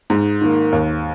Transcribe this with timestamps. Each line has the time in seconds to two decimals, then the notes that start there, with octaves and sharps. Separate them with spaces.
0.10 G#2
0.41 D#3 A#3
0.72 D#2